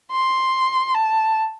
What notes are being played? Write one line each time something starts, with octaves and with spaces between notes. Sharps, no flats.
C6
A5